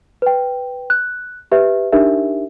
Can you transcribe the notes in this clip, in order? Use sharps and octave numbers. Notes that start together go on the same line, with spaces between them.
B4 G5
F#6
G4 B4 E5
D4 D#4 G4 A#4 E5